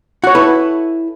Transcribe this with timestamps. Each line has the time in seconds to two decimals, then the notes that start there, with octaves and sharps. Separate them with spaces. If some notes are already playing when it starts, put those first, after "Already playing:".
0.24 F#4 C#5 F#5
0.35 E4 A4 B4